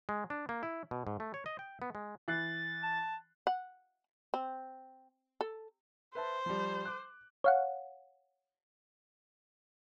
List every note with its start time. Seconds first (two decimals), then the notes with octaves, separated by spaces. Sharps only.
0.09 G#3
0.30 D4
0.49 A#3
0.63 E4
0.91 B2
1.07 G#2
1.20 A3
1.34 C#5
1.46 D#5
1.59 G5
1.82 B3
1.95 G#3
2.28 E3 F#6 A6 C7
2.83 A5
3.47 F#5
4.34 C4
5.41 A4
6.15 B4 C5 E5 A5
6.46 F3 G3
6.85 D6 F#6
7.44 C#5 F5 F#5